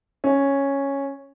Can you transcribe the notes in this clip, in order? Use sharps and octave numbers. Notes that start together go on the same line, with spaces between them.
C#4